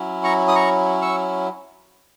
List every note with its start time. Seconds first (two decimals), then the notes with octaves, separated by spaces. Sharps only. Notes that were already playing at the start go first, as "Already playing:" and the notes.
Already playing: F#3 C#4 E4
0.24 A#5 C#6
0.48 D#6
0.55 A#5 C#6
1.02 C#6 E6